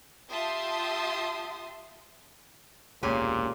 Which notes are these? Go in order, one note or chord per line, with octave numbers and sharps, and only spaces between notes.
F4 G4 E5 A5 C6 D#6
E1 C#2 A#2 C#3 A#3 G4 G#5